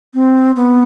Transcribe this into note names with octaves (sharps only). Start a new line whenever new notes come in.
C4
B3